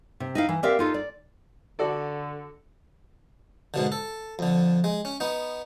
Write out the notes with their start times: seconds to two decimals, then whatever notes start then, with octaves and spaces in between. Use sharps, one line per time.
0.20 C3
0.35 D#4 E4 F5
0.49 E3
0.63 C4 G4 A#4 D5 E5 F5
0.79 D#4 F4 A4
0.94 D5
1.79 D3 F#4 A4 D5
3.74 G#2 B2 D3
3.92 A4
4.39 F2 D3
4.84 G#3
5.05 C#4
5.20 B3 D#4